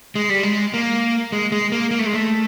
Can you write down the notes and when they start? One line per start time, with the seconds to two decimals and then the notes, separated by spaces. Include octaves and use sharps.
0.15 G#3
0.29 G3
0.43 G#3
0.74 A#3
1.32 G#3
1.52 G#3
1.72 A#3
1.91 A#3
1.99 A3
2.06 G#3
2.14 A3